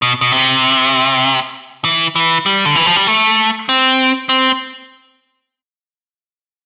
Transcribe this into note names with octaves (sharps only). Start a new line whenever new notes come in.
B2
B2
C3
E3
E3
G3
D3
E3
F3
G3
A3
C4
C4